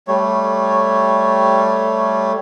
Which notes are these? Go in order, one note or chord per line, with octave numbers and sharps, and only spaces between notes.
G3 A3 C#5